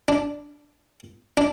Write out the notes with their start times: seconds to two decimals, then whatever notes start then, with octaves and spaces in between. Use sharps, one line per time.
0.08 D4
1.37 D4